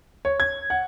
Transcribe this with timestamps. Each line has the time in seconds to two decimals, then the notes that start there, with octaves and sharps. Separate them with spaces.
0.25 C#5
0.40 G#6
0.70 F#5